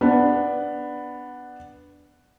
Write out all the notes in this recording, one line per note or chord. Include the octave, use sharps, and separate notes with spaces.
B3 D4